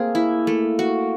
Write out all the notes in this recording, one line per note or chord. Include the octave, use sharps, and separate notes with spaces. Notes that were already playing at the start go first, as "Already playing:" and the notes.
Already playing: A3 A#3 C4 G#4
E4
A3
F#4